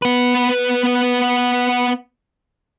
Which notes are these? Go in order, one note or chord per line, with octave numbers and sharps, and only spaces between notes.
B3 B4